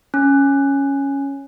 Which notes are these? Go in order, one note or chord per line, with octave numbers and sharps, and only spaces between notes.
C#4